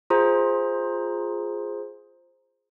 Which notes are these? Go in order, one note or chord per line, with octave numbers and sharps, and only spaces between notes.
F4 G#4 C5 A#5